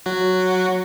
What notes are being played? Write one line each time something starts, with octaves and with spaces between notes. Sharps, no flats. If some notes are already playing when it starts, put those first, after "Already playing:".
F#3 F#4